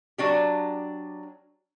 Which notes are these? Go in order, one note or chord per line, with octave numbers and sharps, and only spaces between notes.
F#3 D4 G4